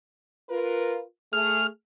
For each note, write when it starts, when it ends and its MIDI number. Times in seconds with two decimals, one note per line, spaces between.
0.50 1.01 65
0.50 1.01 70
0.50 1.01 71
1.33 1.65 57
1.33 1.65 68
1.33 1.67 89